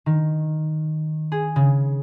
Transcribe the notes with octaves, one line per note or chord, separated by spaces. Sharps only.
D#3
G#4
C#3